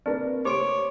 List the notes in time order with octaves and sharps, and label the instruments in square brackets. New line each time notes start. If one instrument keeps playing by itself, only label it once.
[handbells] C4 [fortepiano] D4 A#4 B4
[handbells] G4 C6 D7 [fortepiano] C5 D6 [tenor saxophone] C#5